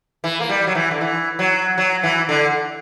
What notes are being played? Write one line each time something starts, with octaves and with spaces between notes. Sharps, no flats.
E3
A#3
G3
F#3
E3
D3
E3
F#3
F#3
E3
D3